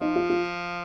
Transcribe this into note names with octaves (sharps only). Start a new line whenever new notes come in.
F3 D#4
F4
F4